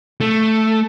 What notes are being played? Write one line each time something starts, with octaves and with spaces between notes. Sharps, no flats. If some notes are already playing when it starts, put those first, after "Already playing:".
A3